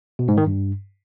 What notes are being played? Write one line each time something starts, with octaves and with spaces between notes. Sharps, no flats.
B2
G#2
D#3
G2